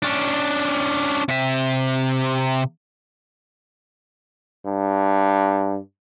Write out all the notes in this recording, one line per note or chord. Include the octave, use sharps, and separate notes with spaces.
C#4 D4
C3 E5
G2